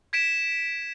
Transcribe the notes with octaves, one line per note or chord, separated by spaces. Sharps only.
G#6 B6 D7 E7